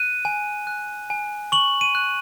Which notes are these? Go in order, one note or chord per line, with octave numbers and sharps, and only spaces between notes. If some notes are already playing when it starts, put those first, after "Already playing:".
Already playing: F#6 D#7
G#5
F#6
G#5
C#6 F#7
D#7
F#6